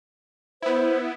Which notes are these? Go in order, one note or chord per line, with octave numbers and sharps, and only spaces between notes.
B3 E4 C5